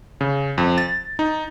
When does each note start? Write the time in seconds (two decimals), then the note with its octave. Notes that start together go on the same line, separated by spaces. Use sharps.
0.21 C#3
0.58 F2
0.78 A6
1.19 D#4